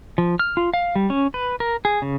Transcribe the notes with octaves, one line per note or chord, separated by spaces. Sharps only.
F3
F6
F4
F5
G3
C#4
B4
A#4
G#4
C#3